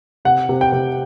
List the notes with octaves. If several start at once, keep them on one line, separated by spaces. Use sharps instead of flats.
C3 F#5
C3
G5
C3